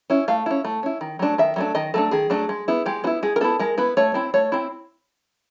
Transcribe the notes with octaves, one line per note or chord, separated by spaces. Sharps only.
C#4 E4
A3 F5
C#4 E4
A3
C#4 E4
D#3
F#3 A3 D4
D#3 E5
F#3 A3 D4
D#3 D#5
F#3 A3 D4 A4
D#3 G#4
F#3 A3 D4
G#3
B3 E4
G#3 G4
B3 E4 F#4
G#3 G#4
A#4
B3 E4 A4
G#3 A#4
B3 E4 B4
A3 C#5
C4 E4
A3 C#5
C4 E4